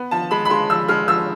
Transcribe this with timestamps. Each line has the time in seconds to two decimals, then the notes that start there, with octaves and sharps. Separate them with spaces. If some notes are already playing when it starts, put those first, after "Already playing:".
Already playing: B3
0.11 F3 A5
0.31 G#3 B5
0.45 B5
0.50 G#3 C6
0.70 F3 E6
0.88 G#3 F6
1.08 F3 E6